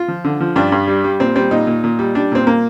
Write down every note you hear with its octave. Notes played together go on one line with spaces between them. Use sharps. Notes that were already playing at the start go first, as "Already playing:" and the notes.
Already playing: F4
F3
D3
F3
G2 D4
G2
G3
G3
A#2 C4
G3 C4
A#2 D#4
A#2
A#2
G3
G3 D4
A#2 C4
A#3